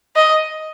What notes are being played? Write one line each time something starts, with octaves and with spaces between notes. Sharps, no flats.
D#5